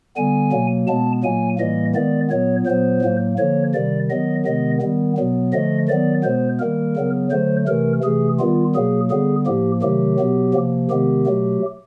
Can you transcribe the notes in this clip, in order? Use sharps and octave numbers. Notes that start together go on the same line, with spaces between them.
D3 G3 B3 G#5
B2 F#3 A#3
B2 G#3 B3 A5
A#2 F#3 A#3 G#5
A2 E3 G3 A#3 D#5
D#3 G#3 B3 D5
A#2 F#3 B3 C#5
A#2 F#3 B3 C5
A2 F#3 A#3
D3 F3 A#3 C#5
C3 D#3 G3 D5
D#3 F#3 B3 D#5
C3 D#3 G#3 B3 D#5
D#3 G3 B3
B2 F#3 B3
D3 F3 A3 D#5
D#3 F#3 B3 D5
B2 G#3 B3 C5
D#3 G3 A#3 A#4
C#3 F#3 B3
D3 F#3 A3 C5
C3 E3 A3 A#4
C3 E3 A3 G#4
D#3 G3 B3 F4
B2 F#3 A#3 G#4
D3 G3 B3 G#4
A2 F3 A#3 G4
C3 D#3 F#3 A3 G4
B2 F#3 B3
C3 F3 A#3
C3 D#3 G#3 B3 G4
B2 F#3 A3